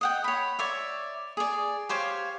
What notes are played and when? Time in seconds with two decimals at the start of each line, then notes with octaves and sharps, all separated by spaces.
0.01 D#5 F#5 G5
0.24 C#5 B5
0.59 C#5 D5 E5
1.37 G#4 D5
1.89 G4 C5 C#5 F5